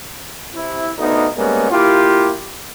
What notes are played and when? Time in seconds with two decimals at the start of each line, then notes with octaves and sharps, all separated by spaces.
0.54 C3 E4
0.97 D2 B3 D#4
1.36 G3 G#3 A#3 B3 C#4
1.71 A#3 E4 F4 G4